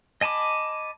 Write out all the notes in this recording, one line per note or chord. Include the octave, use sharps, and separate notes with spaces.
D#5 G#5 A5 B5 D6